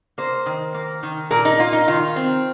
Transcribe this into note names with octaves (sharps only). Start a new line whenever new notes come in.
A#3 C5
D#3
A#3
D#3
A#2 A#4
D#4
A#3 F4
D#4
D#3 F4
C4